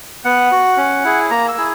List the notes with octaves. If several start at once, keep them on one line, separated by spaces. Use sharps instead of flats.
B3 F#5
F#4
C#4
E4 G#4
A#3 A#5
E6
E4 G#4